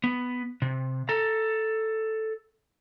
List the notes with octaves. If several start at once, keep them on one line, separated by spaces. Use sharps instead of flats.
B3
C3
A4 A#5